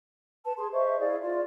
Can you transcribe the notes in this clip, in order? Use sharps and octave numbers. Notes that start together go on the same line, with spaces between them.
B4 A5
G#4 C6
C5 D#5 E5 C#6
E4 G#4 D5 F5
F4 D5